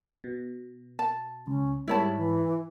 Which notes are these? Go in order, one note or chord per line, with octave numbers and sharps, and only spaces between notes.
B2
A5
C#2 C#4
G#2 G3 E4 C#5 A5 B5
E3